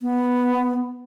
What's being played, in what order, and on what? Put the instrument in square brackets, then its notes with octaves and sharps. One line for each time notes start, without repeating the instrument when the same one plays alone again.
[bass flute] B3